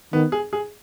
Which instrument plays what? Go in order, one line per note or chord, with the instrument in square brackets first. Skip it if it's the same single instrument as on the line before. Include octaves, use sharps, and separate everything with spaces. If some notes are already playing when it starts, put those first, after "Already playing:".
[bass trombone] D#3 [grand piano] B3
[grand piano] G#4
G#4